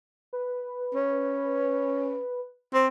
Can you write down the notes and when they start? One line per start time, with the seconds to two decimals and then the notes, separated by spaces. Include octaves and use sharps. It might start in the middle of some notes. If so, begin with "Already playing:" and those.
0.33 B4
0.94 C#4
2.73 C4